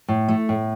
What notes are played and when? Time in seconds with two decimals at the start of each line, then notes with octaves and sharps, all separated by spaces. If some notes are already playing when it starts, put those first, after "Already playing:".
0.08 A2
0.28 A3
0.49 A2